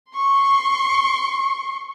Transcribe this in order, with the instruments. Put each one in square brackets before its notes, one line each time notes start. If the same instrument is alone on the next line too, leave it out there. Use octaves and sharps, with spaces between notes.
[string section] C6 C#6